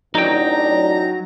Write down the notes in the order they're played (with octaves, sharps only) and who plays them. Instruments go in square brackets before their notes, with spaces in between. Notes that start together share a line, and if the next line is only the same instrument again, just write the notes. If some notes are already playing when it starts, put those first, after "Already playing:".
[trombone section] A1 D4 [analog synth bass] F#3 [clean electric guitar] D#4 G5 [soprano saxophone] A#5